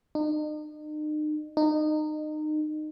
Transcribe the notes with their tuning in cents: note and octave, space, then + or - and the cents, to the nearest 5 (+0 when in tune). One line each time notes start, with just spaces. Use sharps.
D#4 -40
D#4 -25